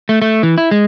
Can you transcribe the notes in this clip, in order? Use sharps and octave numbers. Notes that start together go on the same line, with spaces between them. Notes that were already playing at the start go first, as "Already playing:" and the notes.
A3
A3
E3
E4
G#3